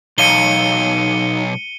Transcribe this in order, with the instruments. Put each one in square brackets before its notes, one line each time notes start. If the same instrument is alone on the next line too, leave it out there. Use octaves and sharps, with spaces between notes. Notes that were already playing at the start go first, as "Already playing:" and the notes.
[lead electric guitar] B1 [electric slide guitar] D#4 C#5 F5 [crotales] C#7 D#7 G7